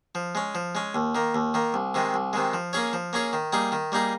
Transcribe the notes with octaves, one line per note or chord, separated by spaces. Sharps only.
F3
G#3 C#4
F3
G#3 C#4
D#2
D#3 A#3
D#2
D#3 A#3
C2
C3 D#3 G#3
C2
C3 D#3 G#3
F3
A#3 C#4 G#4 C#5
F3
A#3 C#4 G#4 C#5
D#3
G3 A#3 D#4 G#4
D#3
G3 A#3 D#4 G#4